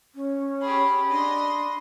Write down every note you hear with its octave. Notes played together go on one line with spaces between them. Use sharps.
C#4
G4 G#4 B5
D4 D#5 C6